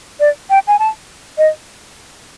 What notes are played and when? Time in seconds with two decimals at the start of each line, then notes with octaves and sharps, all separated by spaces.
0.20 D5
0.50 G5
0.68 G#5
0.79 A5
1.38 D#5